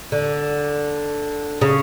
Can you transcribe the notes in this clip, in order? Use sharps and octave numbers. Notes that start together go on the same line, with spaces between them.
D3
C#3